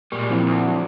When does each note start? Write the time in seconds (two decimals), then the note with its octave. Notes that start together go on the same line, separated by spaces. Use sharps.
0.12 A#2 G3 G#3 C#6
0.30 G#2 E3 F3 C4 E4
0.46 D2
0.63 F#3